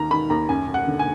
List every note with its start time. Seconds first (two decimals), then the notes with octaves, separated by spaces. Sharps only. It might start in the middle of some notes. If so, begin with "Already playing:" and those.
Already playing: D#2 D#3 A#5
0.11 D#3 B5
0.30 D#2 A#5
0.49 F#2 G#5
0.68 F#2
0.74 F#5
0.87 D3
0.99 G#5